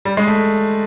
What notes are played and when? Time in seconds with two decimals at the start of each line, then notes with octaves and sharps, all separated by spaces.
0.05 G3
0.17 G#3
0.28 A3